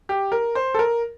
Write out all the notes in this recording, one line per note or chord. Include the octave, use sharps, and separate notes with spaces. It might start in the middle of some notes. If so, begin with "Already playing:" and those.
G4
A#4
C5
A4
A#4